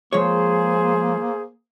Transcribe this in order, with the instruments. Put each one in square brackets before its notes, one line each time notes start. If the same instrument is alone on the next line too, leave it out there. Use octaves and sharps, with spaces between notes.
[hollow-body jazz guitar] F3 G#3 C#5 [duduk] A#3 [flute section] G#4 C5